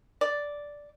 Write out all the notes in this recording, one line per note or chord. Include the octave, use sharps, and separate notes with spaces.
D5